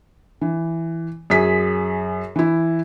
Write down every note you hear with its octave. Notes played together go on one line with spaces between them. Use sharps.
E3
F#2 G#4 B6
E3 E4